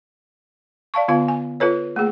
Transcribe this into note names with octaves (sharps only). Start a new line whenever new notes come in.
D5 F5 A5 C#6
D3 B3 F4 F5
G#5
F4 A4 B4 C#5
A3 A#3 G#4